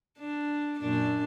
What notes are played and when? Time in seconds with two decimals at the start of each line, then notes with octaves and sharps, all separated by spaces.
0.19 D4
0.80 F#2 A#2 D4